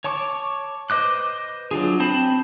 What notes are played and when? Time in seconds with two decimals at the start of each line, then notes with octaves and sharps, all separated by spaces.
0.04 C#5 A5 C#6 D6
0.90 B4 C5 D#5 D6 F#6
1.71 F#3 D4 F4 G#4
2.00 C4 C5 A5 B5